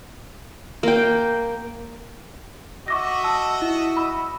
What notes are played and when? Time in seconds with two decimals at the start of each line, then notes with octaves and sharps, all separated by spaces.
0.83 A#3 G5
2.88 F#4 D#5 E5 C#6 D6 A#6
3.24 A5 E6
3.62 E4
3.97 B5 E6